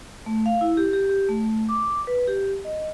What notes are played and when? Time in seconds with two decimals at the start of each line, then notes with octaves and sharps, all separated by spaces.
0.26 A3
0.46 F5
0.61 E4
0.77 G4
0.93 G4
1.10 G4
1.29 A3
1.69 D6
2.07 B4
2.28 G4
2.65 D#5